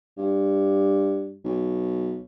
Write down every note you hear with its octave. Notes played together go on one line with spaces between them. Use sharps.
G2
B1